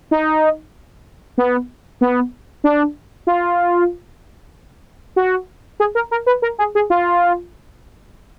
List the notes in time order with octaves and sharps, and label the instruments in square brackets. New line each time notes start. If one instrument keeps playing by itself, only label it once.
[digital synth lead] D#4
B3
B3
D4
F4
F#4
G#4
A#4
A#4
B4
A#4
G#4
G#4
F4